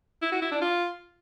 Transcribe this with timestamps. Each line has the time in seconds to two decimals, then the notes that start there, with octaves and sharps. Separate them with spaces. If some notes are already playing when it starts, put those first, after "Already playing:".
0.22 E4
0.32 F#4
0.42 E4
0.52 D4
0.61 F4